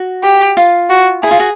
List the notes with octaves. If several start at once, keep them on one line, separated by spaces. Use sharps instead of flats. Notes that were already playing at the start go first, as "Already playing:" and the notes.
Already playing: F#4
G4
F4
F#4
E4 G#4
F4
F#4